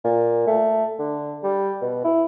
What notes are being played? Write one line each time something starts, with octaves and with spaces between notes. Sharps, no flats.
A#2
A3
D3
G3
B2
E4